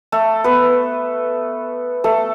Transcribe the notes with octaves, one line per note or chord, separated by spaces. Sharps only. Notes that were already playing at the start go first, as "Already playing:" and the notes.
A3 A4
B3 B4
A3 A4